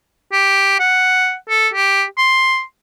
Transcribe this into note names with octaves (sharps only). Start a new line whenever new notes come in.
G4
F#5
A4
G4
C6